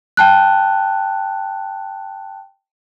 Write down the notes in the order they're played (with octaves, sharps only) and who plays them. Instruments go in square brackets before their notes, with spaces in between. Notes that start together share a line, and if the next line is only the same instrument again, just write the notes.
[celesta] G5 A5 F#6